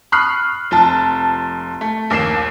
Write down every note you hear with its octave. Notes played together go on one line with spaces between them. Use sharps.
B5 C#6 D#6 F6 F#6 C7
F1 F3 A5
A3
A#1 D#2 A#3 C7 E7